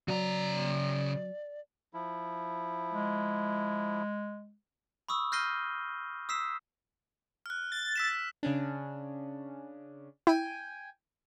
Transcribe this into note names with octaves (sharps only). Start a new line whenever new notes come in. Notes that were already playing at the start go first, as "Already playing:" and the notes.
C#3 F#3 D5 A#5
F3 E4
G#3
B5 C#6 D#6 E6
F6 G6 A#6 C7 D#7 G7
D#6 E6 B6 C7 E7
F6 F#6
A6
E6 B6 E7
C#3 C#4 D4
E4 G5 G#5